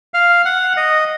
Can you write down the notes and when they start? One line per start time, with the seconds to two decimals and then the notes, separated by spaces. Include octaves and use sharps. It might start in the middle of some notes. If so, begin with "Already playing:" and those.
0.14 F5
0.45 F#5
0.77 D#5